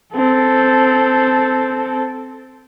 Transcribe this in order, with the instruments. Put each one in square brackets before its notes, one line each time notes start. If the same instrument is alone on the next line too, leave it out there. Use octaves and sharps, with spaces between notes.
[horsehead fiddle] C4 A4